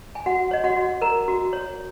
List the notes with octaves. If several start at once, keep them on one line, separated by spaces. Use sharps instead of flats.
G#5
F#4 F#5
C#5 D#5
F#4 F#5
F#4
A#4 A#5
F#4
C#5